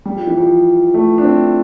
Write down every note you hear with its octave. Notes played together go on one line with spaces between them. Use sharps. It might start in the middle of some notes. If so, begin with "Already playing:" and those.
G3
F3
E3
F3
A3
D4
C4